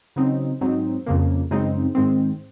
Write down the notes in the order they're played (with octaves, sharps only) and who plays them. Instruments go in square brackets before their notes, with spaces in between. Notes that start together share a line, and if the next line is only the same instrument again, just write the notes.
[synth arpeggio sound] C#3 F#3 C4 D#4
G#2 F#3 C4 D#4
F2 C#3 F3 A#3
F#2 C#3 G#3 C4 D#4
G#2 D#3 G#3 C4